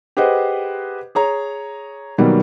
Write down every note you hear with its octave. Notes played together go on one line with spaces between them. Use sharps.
G4 G#4 B4 C5 D#5 F#5
G#4 C#5 A#5
B2 D#3 F#3 G3 A#3 B3